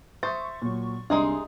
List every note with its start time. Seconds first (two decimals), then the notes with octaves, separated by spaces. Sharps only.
0.23 C5 E5 C#6 D#6 A6
0.62 A#2 F#3
1.10 C2 G#3 D4 D#4 G#4 E5 C6 D#6